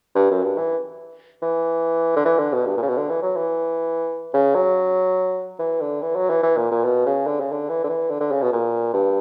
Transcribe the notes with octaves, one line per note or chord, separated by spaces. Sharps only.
G2
F#2
G2
E3
E3
D3
E3
D3
B2
G2
A#2
C#3
B2
D3
E3
F#3
E3
C#3
F#3
E3
D3
E3
F#3
E3
E3
A#2
A#2
B2
C#3
D3
C#3
D3
E3
D3
E3
D3
D3
C#3
B2
A#2
G2